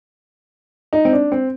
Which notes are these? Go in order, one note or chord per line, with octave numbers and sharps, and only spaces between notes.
D#4
C4
D4
C4